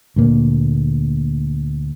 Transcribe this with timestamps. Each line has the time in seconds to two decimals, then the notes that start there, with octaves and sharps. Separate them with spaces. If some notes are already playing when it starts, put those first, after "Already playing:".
0.16 D2 A#2 A#3